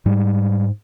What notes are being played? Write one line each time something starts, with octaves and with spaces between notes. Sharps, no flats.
G#2 G3